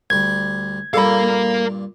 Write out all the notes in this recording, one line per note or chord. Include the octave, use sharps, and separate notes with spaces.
D2 G3 G#6
G2 A#2 A4 A#4 F5 B5